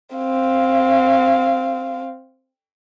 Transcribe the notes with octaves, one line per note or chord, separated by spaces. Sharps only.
C4 F5